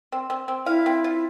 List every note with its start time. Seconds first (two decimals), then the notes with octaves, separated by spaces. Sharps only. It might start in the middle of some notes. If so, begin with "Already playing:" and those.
0.12 C4
0.30 C4
0.48 C4
0.66 E4 F5
0.86 C4
1.04 F4